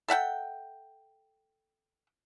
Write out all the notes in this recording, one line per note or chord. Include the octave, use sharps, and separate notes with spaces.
A4 E5 F#5 G5